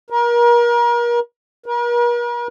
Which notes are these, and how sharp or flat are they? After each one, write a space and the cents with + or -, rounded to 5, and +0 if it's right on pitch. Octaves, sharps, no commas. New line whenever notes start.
A#4 +35
A#4 +45